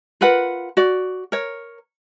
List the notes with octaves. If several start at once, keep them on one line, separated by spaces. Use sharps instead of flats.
F4 A#4 B4 F#5
F#4 D5
A#4 C#5